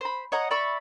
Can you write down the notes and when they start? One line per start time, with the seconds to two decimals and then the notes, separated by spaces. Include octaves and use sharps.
0.01 C5 B5
0.32 C#5 D#5 F#5 A#5
0.51 D5 E5 B5 C#6